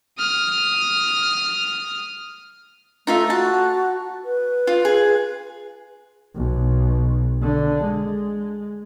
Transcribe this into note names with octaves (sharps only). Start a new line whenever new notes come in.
D#6 F6
A3 D#4 F4 E5
F#4 A5
B4
F4
G#4
B1
D3
G#3